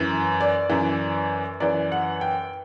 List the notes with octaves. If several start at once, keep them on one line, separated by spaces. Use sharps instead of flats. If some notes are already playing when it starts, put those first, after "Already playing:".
Already playing: F#2 E3
D5
F#2 E3
F#2 E3 D5
F#5
G5